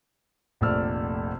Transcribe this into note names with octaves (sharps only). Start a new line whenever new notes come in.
F1 A#1 A3 D5 E6 F6